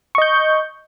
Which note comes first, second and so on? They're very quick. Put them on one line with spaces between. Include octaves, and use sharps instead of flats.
C#6 D#5 G6